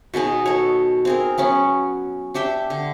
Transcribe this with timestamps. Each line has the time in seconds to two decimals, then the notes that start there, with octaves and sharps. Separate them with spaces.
0.14 B2 D#3 G#4 D#5
0.46 A4 C#5
1.05 C4 G#4 A#4
1.38 F#3 B3 C#4
2.34 D4 G4 E5 G5
2.70 D3